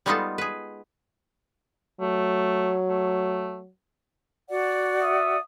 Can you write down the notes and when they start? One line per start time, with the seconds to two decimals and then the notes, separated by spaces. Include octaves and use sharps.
0.06 G3 G#3 B3 D#4 F4 A4
0.38 G#4 B4
2.01 F#3 A3
2.89 A3
4.49 F#4 D5 F#5
5.02 E5 D#6